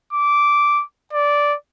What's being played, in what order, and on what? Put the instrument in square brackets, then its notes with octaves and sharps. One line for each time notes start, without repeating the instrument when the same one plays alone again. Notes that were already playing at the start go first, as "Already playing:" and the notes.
[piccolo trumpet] D6
D5